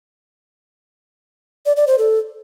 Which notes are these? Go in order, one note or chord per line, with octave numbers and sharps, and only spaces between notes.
D5
D5
C5
A4